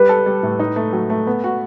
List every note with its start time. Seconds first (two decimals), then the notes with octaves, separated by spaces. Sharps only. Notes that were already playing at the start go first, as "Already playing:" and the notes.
Already playing: G3 B4
0.09 A4
0.26 G3
0.43 A2
0.60 D#4
0.76 A3
0.93 F#3
1.10 A3
1.27 B3
1.44 F#4